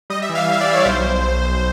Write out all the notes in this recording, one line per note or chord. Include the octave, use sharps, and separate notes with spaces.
G3 D#5
E5
E3
F5
G3 E5
D5
G3
C#5
B1 C5
B1
B1
B1